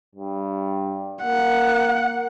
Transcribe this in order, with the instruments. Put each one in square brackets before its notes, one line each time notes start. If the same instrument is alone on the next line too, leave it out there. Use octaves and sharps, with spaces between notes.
[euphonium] G2
[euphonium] A#3 [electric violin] F#5